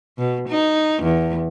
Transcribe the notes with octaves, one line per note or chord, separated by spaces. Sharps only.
B2
D#4
E2